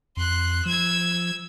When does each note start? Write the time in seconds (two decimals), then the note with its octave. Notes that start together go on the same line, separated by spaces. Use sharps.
0.17 F2 C6 F#6
0.65 F3 E6 G#6